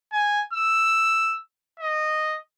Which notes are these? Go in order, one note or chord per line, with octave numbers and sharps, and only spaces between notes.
G#5
E6
D#5